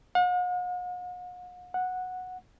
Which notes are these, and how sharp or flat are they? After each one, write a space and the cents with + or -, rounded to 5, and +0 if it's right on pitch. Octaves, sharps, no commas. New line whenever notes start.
F#5 -45
F#5 -10